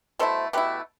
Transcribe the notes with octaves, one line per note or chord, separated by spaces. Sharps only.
B2 A3 E4 A4 C5
B2 A3 E4 G4 B4